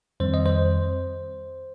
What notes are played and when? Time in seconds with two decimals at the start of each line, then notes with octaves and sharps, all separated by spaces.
0.20 F2 D#3 G3 C4 C5
0.34 D#5
0.46 C5